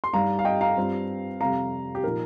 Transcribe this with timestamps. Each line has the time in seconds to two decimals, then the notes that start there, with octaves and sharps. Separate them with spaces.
0.04 C6
0.13 G2 G3 D#4 F5 A#5
0.39 F5
0.45 D#5 G5
0.61 F5 A#5
0.77 G2 G3 C4 F4
1.40 F2 C3 G3 F5 A#5
1.95 G4
2.03 A#2 F3 D#4 A#4